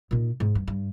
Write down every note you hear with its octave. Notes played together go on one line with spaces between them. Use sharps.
A#2 D#4
G#2
G2
G2